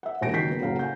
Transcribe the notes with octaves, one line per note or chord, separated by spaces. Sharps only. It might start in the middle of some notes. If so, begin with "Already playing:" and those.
E5 F#5
E1 D#2 B2 G#5 A#6 D7
F#1 D#3 F#4 G6 B6 C7
F#2 B3 C#4
F#1 B1 A2 F5 F#5 A#5
G#5 G6